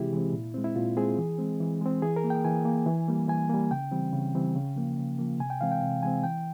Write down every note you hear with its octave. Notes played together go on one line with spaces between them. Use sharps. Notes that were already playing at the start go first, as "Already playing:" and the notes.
Already playing: C3 E3 G#3 C4 E4 G4 G#4
E3 G#3 C4
A#2
G#3 C4
E4
A#2 F4
G#3 C4 G#4
E3
G#3 C4
E3
G#3 C4
E3 G#4
A#4
A#3
G5
E3 G#5
A#3
E3
G3 A#3
E3 G#5
G3 A#3
C#3 G5
E3 G3 C4
C#3
E3 G3 C4
C#3
F3 A#3
C#3
F3 A#3
C3 G#5
G5
E3 G#3 C4 F5
G5
C3
E3 G#3 C4 G#5
E3 G5